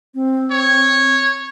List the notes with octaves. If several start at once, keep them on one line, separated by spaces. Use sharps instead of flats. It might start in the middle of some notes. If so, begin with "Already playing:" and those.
C4
C#5